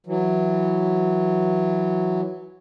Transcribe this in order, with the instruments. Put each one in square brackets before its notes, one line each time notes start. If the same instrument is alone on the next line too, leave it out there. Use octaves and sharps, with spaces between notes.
[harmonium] E3 F#3